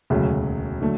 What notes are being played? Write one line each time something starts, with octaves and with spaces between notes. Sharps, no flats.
E1 D2 C#3 F#3
D3 F#3 A3